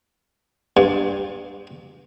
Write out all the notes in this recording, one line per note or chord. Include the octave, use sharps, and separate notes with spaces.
G2